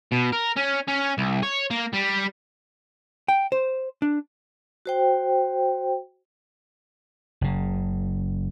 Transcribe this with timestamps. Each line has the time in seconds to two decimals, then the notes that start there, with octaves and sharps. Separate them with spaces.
0.12 B2
0.32 A#4
0.56 C#4
0.88 C#4
1.18 C2
1.43 C#5
1.71 A#3
1.93 G3
3.28 G5
3.52 C5
4.02 D4
4.86 F#4 C5 G5
7.41 F#1 C#3